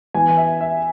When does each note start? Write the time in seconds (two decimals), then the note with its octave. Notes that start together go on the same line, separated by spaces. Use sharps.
0.14 E3 B3 G#5
0.37 E5
0.61 E5